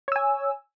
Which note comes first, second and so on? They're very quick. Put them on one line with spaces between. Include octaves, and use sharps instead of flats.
C#5 E6 G#5